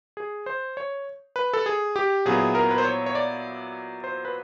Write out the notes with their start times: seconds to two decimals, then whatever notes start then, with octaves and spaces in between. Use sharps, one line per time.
0.17 G#4
0.46 C5
0.77 C#5
1.36 B4
1.53 A4
1.66 G#4
1.96 G4
2.25 A#2 F#3 B3 E4 G#4
2.55 A#4
2.71 B4
2.78 C5
2.85 C#5
3.06 C#5
3.15 D5
4.04 C5
4.25 B4